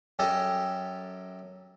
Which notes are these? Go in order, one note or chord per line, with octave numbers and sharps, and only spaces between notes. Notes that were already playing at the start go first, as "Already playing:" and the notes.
F#2 G4 A4 D#5 A5